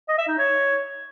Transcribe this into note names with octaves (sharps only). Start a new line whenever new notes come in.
D#5
E5
D#4
C#5